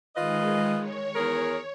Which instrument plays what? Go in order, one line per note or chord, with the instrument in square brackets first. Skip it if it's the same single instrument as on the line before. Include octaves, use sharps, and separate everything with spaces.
[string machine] D#3 G#3 [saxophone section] F4 B4 D#5
[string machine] C#5
[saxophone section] E2 G#4 A#4